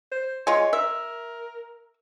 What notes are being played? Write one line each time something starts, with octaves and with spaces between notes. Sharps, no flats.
C5
G#3 F4 C#5
A#4 E5